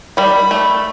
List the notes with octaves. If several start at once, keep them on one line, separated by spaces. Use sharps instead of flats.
D#3 G3 B5
A3